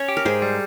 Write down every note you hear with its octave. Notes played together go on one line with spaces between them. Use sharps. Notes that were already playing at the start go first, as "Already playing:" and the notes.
Already playing: C#4 C#5
G4
A#4
G#2 G#4 C5
G3